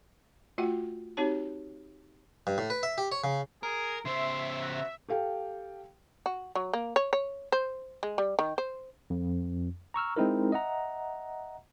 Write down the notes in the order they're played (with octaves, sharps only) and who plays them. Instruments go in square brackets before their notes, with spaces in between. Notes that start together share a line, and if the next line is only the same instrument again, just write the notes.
[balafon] A3 F4 F#4 F#5 G5
C4 D#4 F#4 G4 C#5 A5
[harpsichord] G2
A2
B4
E5
G4
C#5
C#3
[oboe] G#4 [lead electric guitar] A#4
[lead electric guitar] C#3 C5 [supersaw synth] E5 [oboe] C6
[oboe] F#4
[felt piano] G4 A4 F5 G5
[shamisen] F#4
F#3
A#3
C#5
C#5
C5
G#3
G3
D#3
C5
[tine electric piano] F2
A#5 C#6 E6 F6
G#3 C4 D#4 E4 A#4
D#5 E5 F#5 A#5